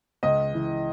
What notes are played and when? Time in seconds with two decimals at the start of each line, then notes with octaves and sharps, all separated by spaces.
0.23 C#2 D#5
0.54 E3